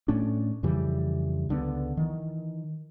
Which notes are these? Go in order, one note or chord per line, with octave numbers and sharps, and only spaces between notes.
A2 A3 C#4 D4
F2 C#3 E3 G3
C#2 D3 G#3 B3
D#3 E3